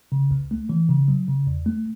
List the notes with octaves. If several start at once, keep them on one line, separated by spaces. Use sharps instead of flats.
C#3
C#2
A3
E3
C#3
F#3
C#3
E2
A3